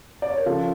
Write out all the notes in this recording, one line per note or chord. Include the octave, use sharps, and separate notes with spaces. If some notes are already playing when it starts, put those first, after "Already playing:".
D5
C#5
A#4
C#3 F3 F4 A4